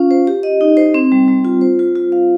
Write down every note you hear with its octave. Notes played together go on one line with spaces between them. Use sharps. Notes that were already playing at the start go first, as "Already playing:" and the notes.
Already playing: C#4 F4 F5
C5
G4
D#5
D#4
C5
C4
G3
G3
F4
C5
F4
F4
F5